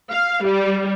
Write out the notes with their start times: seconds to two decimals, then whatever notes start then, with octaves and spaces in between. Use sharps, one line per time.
0.10 F5
0.44 G3